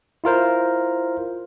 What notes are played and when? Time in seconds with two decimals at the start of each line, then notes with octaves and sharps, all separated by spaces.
0.24 E4 F4 A#4 C5